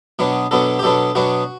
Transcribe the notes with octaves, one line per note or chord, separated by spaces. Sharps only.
B2 F#3 B3 D4
B2 F#3 B3 D4 A4
G4
B2 F#3 B3 D4 A4
B2 F#3 B3 D4 F#4